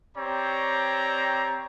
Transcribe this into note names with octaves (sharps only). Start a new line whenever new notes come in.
C4 G4 C#5 D5 A#5